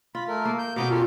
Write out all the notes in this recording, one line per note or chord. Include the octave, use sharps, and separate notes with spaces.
F4 B5
A3 A#4
A#3
G6
B2 B3 C#4 A#5 D6 G6
F4 G4 A4 A#4